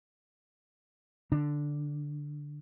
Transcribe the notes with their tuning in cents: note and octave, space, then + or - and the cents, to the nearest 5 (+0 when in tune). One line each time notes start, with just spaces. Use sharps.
D3 +0 D4 +0